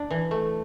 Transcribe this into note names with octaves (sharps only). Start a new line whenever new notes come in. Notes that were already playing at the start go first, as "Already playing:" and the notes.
Already playing: D4
E3
A3